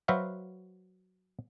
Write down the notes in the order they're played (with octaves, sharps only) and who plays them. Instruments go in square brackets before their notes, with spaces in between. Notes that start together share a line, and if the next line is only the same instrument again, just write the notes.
[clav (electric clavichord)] F#3 F#4 B4 C5 E5 F5